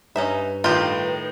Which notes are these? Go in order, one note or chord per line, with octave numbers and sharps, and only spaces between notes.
G2 C#4 D#4 B4 E5
A2 D#3 D#4 F4 G4